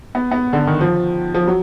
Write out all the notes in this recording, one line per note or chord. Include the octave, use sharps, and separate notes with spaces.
B3
B3
D3
D#3
F3
F3
F#3